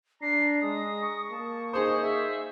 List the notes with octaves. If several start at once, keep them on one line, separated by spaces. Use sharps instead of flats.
D4 A#5 C7
G#3 D#6
C#6
A#3 A5
D#4 G#4 C5 D#6
E5